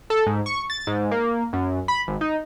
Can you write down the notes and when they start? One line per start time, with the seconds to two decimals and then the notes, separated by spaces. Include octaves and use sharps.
0.10 A4
0.26 G#2
0.46 C#6
0.70 A6
0.87 G#2
1.11 A#3
1.53 F#2
1.88 B5
2.07 G#1
2.21 D#4